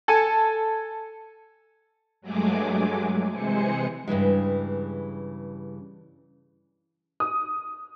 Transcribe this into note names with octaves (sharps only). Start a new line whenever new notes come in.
A4 G#5
G2 F#3 G#3 A3 G#4 D6
C3 E3 G#3 G#4 C5 C#7
G2 C#3 E3 G#3
D#6